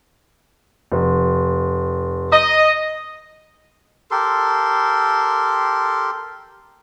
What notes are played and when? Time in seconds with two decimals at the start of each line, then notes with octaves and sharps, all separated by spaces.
0.92 F1
2.32 D#5
4.11 G4 A4 A#4 C6